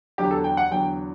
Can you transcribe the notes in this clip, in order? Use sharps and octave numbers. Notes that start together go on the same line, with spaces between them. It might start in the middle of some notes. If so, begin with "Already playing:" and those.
E2 D3 F#3 G4
A4
G5
F#5
E2 D3 F#3 G5